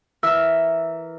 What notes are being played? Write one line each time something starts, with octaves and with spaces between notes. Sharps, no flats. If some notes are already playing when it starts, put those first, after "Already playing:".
E3 A#4 E5 E6 F6